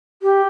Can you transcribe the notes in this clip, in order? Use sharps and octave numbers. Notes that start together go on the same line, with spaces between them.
G4